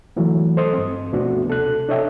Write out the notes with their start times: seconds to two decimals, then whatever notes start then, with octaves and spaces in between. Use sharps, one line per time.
0.16 D3 E3 F#3 A3
0.57 A4 C5 D#5 C6 D#6
0.73 G2 C4
1.13 D2 B2 A3 B3 D4 F#4
1.47 C3 A4 F#6
1.89 D4 A4 C#5 D#5 E5 G5